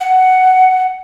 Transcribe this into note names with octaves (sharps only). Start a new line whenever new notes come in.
F#5